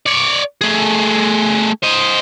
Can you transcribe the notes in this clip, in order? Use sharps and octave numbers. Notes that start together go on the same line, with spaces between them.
C#5 D5
A3 G#4
C5 D#5